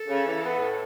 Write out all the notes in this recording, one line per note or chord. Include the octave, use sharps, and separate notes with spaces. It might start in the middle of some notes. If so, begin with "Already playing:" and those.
Already playing: A4
C#3
E3
B3
A2